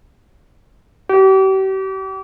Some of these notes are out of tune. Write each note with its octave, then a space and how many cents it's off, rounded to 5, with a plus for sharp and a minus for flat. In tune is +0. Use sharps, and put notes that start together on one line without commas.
G4 -40